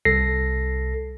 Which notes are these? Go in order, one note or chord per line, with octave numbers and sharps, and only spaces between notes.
C2 A4 A#6 C7